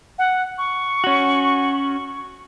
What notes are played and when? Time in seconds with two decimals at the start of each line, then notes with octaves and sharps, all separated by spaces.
0.19 F#5
0.58 C#6
1.04 C#4 F#4